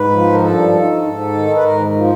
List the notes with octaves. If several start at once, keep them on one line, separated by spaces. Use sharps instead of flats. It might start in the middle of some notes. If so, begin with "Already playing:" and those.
Already playing: G#2 B4
F3
A#4
G2 A4
D#3
G#2
D#3
B4
G#2 A#4
F3